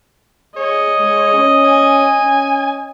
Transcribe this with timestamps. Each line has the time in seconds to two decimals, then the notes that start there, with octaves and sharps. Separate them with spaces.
0.56 G#4 C#5 D#5
0.99 G#3
1.34 C#4
1.65 G#5
2.20 C#4